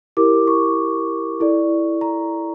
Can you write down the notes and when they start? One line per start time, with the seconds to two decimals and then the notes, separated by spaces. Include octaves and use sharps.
0.17 E4 G4 A#4 D6
0.47 C#6
1.40 E4 A4 D5
2.01 A#5